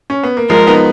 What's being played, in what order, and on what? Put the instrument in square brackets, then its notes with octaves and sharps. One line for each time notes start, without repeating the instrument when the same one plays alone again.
[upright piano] C#4
B3
A#3
[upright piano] F3 G#3 [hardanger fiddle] A#4
[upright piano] B3 D#4